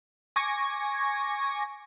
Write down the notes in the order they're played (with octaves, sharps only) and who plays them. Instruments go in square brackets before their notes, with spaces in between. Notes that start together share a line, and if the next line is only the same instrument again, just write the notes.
[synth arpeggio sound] G#5 C#6 D6 G#6 A#6